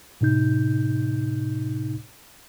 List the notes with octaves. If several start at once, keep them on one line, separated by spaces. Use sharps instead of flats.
A2 C3 D#4 G6